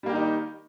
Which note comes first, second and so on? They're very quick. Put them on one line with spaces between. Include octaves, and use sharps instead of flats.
G3 A#3 G4 D#3 D#4